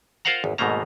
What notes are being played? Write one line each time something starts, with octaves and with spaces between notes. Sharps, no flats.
F4 A#4 C5 F5 F#5 A#5
G#1 E2
G#1 G#2 B2 A3 A#3 A#5